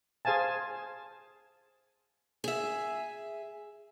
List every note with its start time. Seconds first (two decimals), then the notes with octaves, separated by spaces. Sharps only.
0.25 G#4 C5 F5 G#5 A5
2.44 G#4 E5